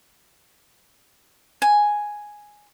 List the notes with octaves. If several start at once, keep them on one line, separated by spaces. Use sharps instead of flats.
G#5